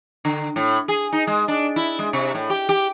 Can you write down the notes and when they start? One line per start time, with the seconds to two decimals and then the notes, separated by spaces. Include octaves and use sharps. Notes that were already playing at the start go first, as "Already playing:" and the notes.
0.25 D3
0.56 A2
0.88 G#4
1.13 D#4
1.27 G#3
1.48 D4
1.76 E4
1.99 G#3
2.13 C3
2.35 A2
2.50 G4
2.69 G4